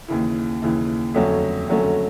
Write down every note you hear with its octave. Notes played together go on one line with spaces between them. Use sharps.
D#2 C#3 E3
D#2 C#3 E3
F2 D3 F#3 A3 C#4
F2 D3 F#3 A3 C#4